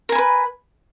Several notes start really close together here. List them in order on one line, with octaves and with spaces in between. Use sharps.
A#4 G#5 B5 B4